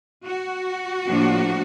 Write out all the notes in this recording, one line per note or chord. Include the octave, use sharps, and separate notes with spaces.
F#4
A2 F3 A#3 D4